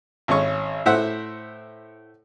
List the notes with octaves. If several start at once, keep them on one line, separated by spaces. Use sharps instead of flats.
G#1 C#4 C#6
A2 C5 E5 F#5